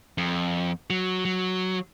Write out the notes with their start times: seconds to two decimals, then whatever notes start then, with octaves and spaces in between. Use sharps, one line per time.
0.18 F2
0.90 F#3
1.25 F#3